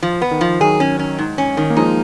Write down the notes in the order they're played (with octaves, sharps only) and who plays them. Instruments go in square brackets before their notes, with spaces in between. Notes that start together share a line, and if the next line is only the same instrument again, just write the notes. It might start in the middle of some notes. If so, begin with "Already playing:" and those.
[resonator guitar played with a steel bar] F3
B3
[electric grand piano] D#3
[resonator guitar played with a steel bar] F3
[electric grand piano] D#3 F#3 [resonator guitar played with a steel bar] G#4
[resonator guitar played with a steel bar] C#4
C#4
G#2
C#4
D#3
[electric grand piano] A#3
[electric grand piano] F3 G#3 [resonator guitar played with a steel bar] D#4